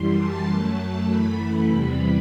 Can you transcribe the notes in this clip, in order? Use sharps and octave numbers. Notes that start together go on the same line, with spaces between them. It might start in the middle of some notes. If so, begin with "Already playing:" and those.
Already playing: F#2 E3 G3 C6
A5
F#2 F#3 A3 A5
F#2 E3 A3 B5
B5
E2 C3 E3 G3